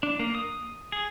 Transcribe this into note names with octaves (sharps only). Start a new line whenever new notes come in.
D4
A#3
D#6
G#4